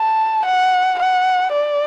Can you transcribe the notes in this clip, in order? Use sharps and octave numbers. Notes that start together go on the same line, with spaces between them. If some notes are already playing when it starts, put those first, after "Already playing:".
Already playing: A5
F#5
F#5
D5